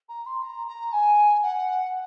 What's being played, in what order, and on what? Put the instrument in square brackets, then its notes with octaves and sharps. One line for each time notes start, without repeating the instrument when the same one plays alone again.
[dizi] A#5
C6
A#5
A#5
G#5
F#5